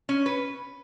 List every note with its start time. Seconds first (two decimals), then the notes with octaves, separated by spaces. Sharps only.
0.09 C#4
0.26 B4